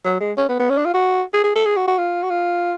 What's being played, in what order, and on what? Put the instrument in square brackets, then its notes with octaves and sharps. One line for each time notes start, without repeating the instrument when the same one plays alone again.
[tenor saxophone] F#3
G#3
C#4
B3
B3
C#4
D4
F4
F#4
G#4
G#4
A4
G#4
F#4
F#4
F4
F#4
F4